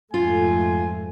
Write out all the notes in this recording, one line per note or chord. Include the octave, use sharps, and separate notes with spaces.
F2 G#2 A3 F4 G#5